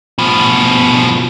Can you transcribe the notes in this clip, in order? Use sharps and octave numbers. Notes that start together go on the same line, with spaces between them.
B2 F3